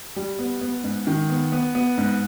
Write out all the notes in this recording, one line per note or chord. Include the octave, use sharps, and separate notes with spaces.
G3
B3
B3
G#2
D#3
B3
B3
B3
G#2